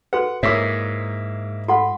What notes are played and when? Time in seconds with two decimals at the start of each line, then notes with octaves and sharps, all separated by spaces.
0.13 F#4 A4 B4 F#5
0.43 G#2 A#3 E4 C#5 E5 D6
1.68 F4 A4 F#5 B5 C6